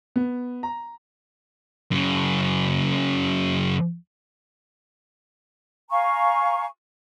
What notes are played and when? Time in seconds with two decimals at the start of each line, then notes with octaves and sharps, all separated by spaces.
0.16 B3
0.63 A#5
1.91 F#2 C#3
5.90 F5 G#5 A#5 C#6